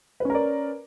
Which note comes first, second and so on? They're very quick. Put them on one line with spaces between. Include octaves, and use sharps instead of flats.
B4 C#4 A#4 D5